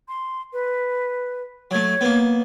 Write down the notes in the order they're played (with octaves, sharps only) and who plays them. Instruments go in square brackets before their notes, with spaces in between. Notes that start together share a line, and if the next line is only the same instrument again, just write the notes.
[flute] C6
B4
[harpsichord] F#3 A3 [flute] C#5
[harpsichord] A#3 B3